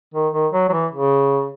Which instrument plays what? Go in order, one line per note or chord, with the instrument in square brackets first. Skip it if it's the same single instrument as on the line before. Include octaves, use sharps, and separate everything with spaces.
[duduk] D#3
D#3
F#3
F#3
E3
C#3